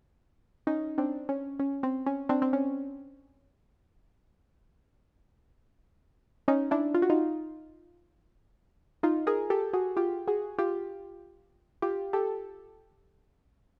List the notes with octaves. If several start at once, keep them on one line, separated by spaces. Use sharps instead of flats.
C#4 D#4
C4 D4
C#4
C#4
C4
C#4
C4 D4
C4
C#4
C#4 D#4
D4 E4
F4
F#4
D#4 F4
D#4 F4
G#4 A#4
G4 A4
F#4 G#4
F4 G4
F#4 G#4
F4 G4
F4 G4
G4 A4